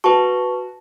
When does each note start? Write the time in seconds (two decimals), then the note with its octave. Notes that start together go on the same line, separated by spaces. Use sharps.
0.04 F#4 B4 A5 C#6